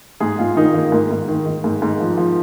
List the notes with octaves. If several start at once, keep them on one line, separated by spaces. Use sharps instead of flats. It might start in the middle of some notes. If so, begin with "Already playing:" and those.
G#2 G#4
G#2 F4
D#3 D#4
D#3 A#3
G#2
G#2
D#3
D#3
G#2
G#2
F3
F3